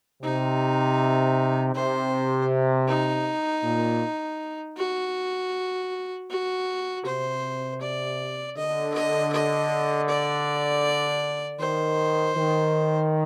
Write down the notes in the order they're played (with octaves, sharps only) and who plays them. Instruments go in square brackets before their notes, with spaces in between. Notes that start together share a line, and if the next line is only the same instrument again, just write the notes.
[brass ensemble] C3 [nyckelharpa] D#4
[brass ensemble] C3 [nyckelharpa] C5
[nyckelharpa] D#4
[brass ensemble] A#2
[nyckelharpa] F#4
F#4
[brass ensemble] C3 [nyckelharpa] C5
[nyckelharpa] D5
[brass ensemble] D3 [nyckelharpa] D#5
[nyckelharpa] D#5
D#5
D5
[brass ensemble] D#3 [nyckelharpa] C5
[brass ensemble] D#3